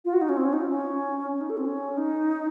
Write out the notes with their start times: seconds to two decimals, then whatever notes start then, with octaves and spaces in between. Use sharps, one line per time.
0.05 F4
0.13 F#4
0.21 D#4
0.29 C#4
0.37 C4
0.45 C#4
0.53 D#4
0.61 F4
0.69 C#4
1.33 C#4
1.41 D#4
1.49 A4
1.57 C4
1.65 C#4
1.97 D#4